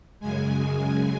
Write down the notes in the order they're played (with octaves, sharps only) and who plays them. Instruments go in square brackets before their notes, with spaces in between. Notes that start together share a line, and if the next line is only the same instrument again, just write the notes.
[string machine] F#2 C#3 G#3 G#5